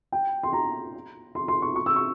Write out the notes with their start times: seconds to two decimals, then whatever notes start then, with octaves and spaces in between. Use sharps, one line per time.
0.12 G5
0.43 C6
0.53 A#5
1.35 C6
1.48 C6
1.62 C#6
1.76 C#6
1.86 E6
1.96 C#6